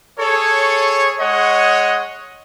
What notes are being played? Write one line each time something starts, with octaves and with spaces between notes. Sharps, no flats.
G#4 A4 C#5
G#3 C#5 D#5 F#5 C#6